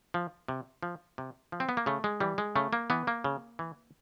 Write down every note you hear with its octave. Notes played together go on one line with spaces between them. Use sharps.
F3
C3
F3
C3
F3
C4
B3
A#3
C#3 A3
G#3
E3 G3
G#3
C#3 A3
A#3
E3 B3
A#3
C#3
E3